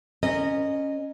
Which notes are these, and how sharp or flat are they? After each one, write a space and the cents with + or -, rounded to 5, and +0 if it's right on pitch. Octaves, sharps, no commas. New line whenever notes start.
C#4 +0 A#4 -10 D#5 -15